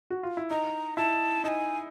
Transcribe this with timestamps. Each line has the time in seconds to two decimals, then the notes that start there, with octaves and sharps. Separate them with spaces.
0.10 F#4
0.23 F4
0.37 E4
0.50 D#4 A#5
0.97 E4 A5
1.44 D#4 A5
1.48 G#5